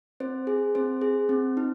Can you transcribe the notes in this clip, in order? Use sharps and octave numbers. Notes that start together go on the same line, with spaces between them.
C4 C5
G#4
C4 C5
G#4
C4
D#4